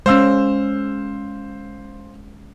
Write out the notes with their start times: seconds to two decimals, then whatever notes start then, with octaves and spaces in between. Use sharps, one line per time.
0.06 G#3 C#4 C5 F5 E6